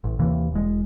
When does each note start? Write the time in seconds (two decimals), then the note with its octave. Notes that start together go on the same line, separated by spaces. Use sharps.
0.04 A1
0.19 D#2 C3 E3 A#3
0.52 E1 G#3